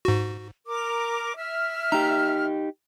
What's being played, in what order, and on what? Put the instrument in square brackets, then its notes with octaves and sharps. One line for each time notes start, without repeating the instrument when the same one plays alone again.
[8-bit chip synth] G#2 F#4
[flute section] A#4 D6
E5 F6
[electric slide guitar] D#4 G4 [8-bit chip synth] A#5